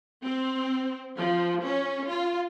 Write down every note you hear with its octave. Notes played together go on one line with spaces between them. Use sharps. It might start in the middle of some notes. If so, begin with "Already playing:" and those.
C4
F3
C#4
F4